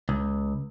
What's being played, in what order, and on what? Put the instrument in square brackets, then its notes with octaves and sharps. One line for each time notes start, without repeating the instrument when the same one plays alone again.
[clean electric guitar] C#2